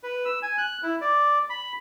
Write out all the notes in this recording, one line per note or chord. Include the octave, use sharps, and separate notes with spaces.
B4
E6
G#5
F#6
E4
D5
B5